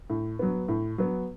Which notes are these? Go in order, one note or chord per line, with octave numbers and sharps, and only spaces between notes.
A2
F#3 B3
A2
F#3 B3